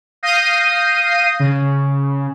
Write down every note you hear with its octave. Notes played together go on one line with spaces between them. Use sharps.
F5 D#6 G6 A#6 C7 D#7
C#3